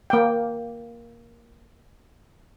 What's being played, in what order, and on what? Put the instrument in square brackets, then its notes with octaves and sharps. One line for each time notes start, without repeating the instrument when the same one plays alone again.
[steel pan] A#3 G5